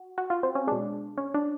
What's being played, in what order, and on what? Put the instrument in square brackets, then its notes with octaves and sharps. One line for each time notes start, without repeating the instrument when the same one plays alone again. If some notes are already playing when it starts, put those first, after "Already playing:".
Already playing: [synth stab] F#4
F#4
F4
C4
C#4
B2 G#3 D4
C#4
D4